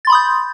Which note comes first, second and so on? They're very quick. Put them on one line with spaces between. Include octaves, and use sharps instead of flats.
A6 C6 B5 D#6 G6